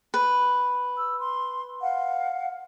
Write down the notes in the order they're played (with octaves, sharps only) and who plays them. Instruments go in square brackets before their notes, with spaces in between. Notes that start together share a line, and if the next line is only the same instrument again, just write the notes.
[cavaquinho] B4
[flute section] E6
C6
F5 F#5